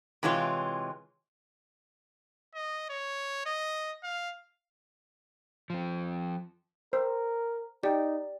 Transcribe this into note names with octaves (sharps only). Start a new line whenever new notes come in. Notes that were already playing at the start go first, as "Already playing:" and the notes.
C3 E3 G#3 F4 C#5
D#5
C#5
D#5
F5
F3 C4
A#4 C5
D#4 G4 D5 G5